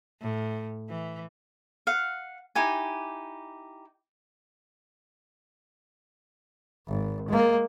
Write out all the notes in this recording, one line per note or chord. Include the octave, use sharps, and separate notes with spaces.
A2
E3
F5 F#5
D#4 E4 G4 G#5
G#1
G#3 A#3